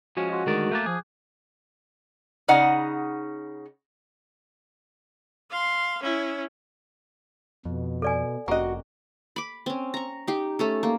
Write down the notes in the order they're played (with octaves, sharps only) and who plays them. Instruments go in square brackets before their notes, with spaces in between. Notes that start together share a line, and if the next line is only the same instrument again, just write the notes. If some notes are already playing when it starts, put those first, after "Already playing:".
[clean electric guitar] F3 G#3 C#4 [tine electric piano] F#4
[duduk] F#4 [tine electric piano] D#5 C6
[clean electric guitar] D2 D#3 D5 [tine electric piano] G#3 G#4 A#4
[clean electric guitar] A3 A#3 A5 [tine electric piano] D6 F#6 G6
[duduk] F3 [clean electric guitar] G#4
[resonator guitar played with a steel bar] C#3 D#4 D#5 F#5
[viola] F5 C6
C#4 E4
[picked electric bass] F2 [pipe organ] B2
[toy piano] A4 D5 G#5
[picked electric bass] F1 [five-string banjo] A#3 D#5 [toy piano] C#4 G4 [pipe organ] F#4
[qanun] B5 D6
C4 C#4
A#5 C#6
D#4 G4
A3 C#4 A4
A#3